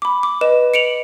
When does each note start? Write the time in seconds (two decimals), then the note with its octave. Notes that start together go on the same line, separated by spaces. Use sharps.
0.02 B5 D6
0.23 D6
0.41 B4 D#5 E7
0.74 C#7 D7 F7 F#7